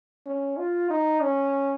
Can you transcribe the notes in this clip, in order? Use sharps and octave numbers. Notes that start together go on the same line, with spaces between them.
C#4
F4
D#4
C#4